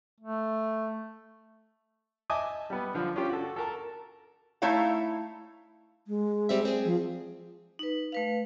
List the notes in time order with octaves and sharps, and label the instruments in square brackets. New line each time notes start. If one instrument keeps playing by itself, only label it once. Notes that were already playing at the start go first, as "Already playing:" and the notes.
[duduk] A3
[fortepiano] D#5 E5 G#5 A5 D6 D#6
G3 B3
D3 F3 C5 F5
C#4 D4 F4 G4
F#4 A4
A4 A#4 A5
[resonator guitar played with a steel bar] A3 D#4 E4 C#5 F5
[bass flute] G#3
[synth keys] G3 C4 E5
C4 G#4
[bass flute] F3
[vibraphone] D#4 B4
A3 B4 F5